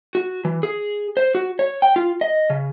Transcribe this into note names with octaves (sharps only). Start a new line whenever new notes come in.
F#4
E3
G#4
C5
F#4
C#5
G5
F4
D#5
C#3